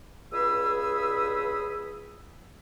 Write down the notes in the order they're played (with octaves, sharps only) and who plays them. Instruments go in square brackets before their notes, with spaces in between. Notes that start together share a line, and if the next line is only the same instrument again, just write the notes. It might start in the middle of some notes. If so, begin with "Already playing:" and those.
[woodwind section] C#2 G2 G#4 B5 D#6 E6